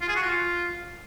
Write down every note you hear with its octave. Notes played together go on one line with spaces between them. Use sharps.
F4
G#4
F#4
F4